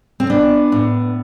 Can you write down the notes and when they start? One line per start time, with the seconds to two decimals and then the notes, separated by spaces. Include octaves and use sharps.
0.20 C4
0.30 B3 D4
0.72 A2